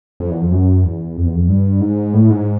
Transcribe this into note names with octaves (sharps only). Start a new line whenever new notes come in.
F2
E2
F2
F#2
E2
F2
E2
F2
G2
G#2
A2
G#2